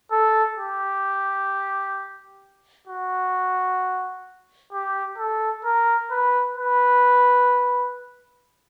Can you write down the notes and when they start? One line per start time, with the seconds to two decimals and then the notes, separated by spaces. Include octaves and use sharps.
0.11 A4
0.58 G4
2.87 F#4
4.73 G4
5.18 A4
5.64 A#4
6.11 B4
6.57 B4